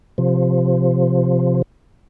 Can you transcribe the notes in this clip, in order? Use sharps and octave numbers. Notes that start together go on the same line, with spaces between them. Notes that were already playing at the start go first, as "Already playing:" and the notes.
C3 F3